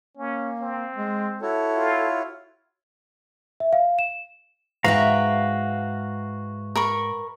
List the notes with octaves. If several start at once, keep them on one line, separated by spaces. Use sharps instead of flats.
A#3 C#4
C4
G#3
E4 F#4 A4 C#5
F4
E5
F5
E7
G#2 F#4 B4 E5 F5 G5 A#5
A#4 B5 C#6